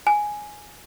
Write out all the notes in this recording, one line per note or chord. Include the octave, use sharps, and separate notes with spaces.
G#5